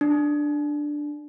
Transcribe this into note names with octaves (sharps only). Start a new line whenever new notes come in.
D4